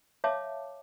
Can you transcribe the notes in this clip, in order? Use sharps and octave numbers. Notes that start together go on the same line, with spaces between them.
C#5 E5 F5 A5 D6